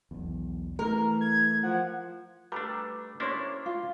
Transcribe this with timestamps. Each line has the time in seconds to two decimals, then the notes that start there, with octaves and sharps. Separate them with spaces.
0.11 B1 E2
0.79 E3 A3 A#4
1.21 G#6
1.63 F3 F#5
2.52 G3 A3 D4 B4 A#5
3.20 A#3 C#4 D4 E4 C5 C#5
3.66 F4